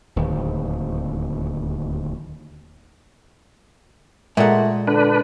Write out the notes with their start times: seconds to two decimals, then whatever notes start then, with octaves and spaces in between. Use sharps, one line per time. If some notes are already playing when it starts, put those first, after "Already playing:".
0.16 D1 D#2
4.37 A#2 G#3 A3 F#5
4.87 D3 D4 B4